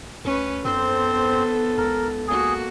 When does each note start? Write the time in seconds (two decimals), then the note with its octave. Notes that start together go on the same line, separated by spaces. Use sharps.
0.25 D2 C#4 B4
0.65 F#2 B3 C4 A4 C5
1.78 C#2 A#4
2.28 A#3 F#4 G#4